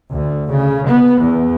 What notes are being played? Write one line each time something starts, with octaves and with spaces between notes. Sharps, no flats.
D2
C#3
B3
E2